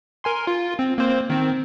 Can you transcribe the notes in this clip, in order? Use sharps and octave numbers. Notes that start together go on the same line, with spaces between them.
A#4 G#5 C6
F4
C4
A#3 C4 C5
D#3 C4